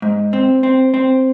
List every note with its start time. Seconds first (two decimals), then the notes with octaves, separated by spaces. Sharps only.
0.02 G#2
0.33 C4
0.63 C4
0.94 C4